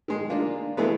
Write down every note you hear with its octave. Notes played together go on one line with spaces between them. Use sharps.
D#3 G#3
A#3 D4 F4
E3 G#3 A3 B3